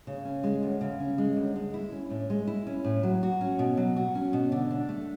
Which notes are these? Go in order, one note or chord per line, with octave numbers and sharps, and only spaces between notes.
C#3
C#4
G#3
D2
C#3
C#4
G#3
D2
G#3
E4
C#4
A2
G#3
E4
C#4
A2
F#3
F#4
C#4
B2
F#3
F#4
C#4
B2
D3
D4
A3